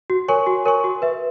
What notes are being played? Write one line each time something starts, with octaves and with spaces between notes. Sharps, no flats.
F#4
A#4 C#5 G#5 C#6
F#4
A#4 C#5 G#5 C#6
F#4
B4 E5